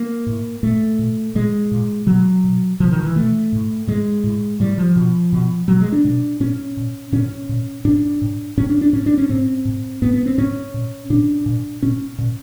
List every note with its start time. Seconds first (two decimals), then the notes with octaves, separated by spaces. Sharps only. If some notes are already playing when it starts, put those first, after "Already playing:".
Already playing: A#3
0.27 A2
0.63 A#2 A3
0.99 A#2
1.35 A#2 G#3
1.71 A#2
2.07 B2 F#3
2.44 B2
2.80 B2 F3
2.91 D#3
3.03 E3
3.16 B2 A3
3.52 A2
3.87 A2 G#3
4.24 A2
4.60 A2 G3
4.78 F3
4.96 B2
5.33 B2
5.68 B2 F#3
5.81 G#3
5.92 D4
6.05 B2
6.40 A#2 C#4
6.77 A#2
7.12 A#2 C#4
7.49 A#2
7.85 A2 D4
8.22 A2
8.57 A2 C#4
8.69 D4
8.81 D4
8.93 A2 C#4
9.06 D4
9.18 C#4
9.29 A2 C4
9.65 A2
10.02 A2 B3
10.14 B3
10.26 C4
10.38 A2 C#4
10.74 A#2
11.10 A#2 D4
11.46 A#2
11.83 A#2 C#4
12.18 A#2